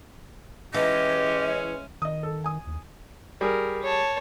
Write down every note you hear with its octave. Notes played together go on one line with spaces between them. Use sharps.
E3 G#3 C#4 G4 D#5
D#3 D#5 D#6
A4
G#5 D#6
D#2
G3 G#4 A#4
C#5 A5